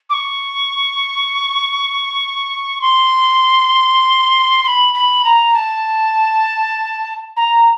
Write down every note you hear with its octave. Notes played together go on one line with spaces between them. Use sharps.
D6
C#6
C6
C6
B5
B5
A#5
A5
A#5